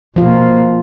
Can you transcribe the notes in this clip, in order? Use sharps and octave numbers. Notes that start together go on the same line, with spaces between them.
B2 F3 A#3 F4